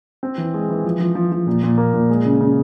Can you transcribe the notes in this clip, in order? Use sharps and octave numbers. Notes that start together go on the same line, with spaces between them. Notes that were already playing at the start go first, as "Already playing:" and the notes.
C4
E3
G#3
E3
F3
F3
F3
F3
A#2
A#2
A#3
A#2
G#3
C#3
C#3